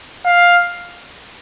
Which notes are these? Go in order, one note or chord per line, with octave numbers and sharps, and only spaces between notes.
F5